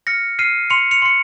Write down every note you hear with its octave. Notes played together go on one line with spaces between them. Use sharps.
F6 A#6 C#7
F6 C7 D#7
C6 C#7 F7
C#7 F7
C6 C#7